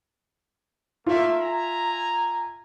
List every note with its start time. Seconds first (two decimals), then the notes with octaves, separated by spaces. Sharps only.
1.06 A3 A#3 F4 E5
1.40 G#5 A#5